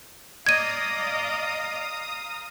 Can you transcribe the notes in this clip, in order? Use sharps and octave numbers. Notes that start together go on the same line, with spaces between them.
D5 D#5 F5 A#5 D#6 G#6 D#7